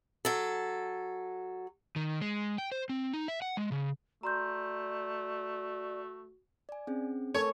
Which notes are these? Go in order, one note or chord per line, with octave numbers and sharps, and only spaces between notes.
F#3 A4
D#3
G#3
G5
C5
C4
D#4
E5
F#5
G#3
C#3
A3 F#4 D5 A#5 C6 G6
D5 G#5
C4 C#4 G#4
A3 A4 A#4 C#5 G#5